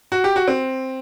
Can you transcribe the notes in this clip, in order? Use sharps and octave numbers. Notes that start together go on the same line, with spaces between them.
F#4
G4
F#4
C4